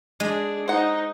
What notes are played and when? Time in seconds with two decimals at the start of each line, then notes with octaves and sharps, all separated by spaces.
0.20 G#3 D4 G#4
0.68 D#4 C5 F#5